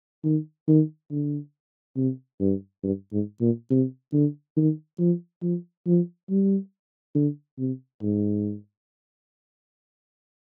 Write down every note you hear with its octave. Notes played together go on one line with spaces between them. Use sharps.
D#3
D#3
D3
C3
G2
G2
G#2
A#2
C3
D3
D#3
F3
F3
F3
G3
D3
C3
G#2